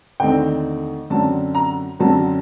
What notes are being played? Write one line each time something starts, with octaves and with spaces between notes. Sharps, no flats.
D#2 D3 A3 C4 D#4 G5
F#2 D3 F#3 C4 A5
A#5
F#2 D3 F#3 C4 A5